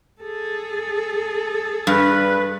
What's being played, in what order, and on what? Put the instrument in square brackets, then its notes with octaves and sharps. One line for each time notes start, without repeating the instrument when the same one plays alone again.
[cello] G#4 A4
[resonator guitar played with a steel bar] G2 [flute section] B4